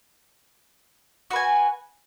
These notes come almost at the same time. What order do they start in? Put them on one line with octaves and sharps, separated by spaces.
F#4 B4 G#5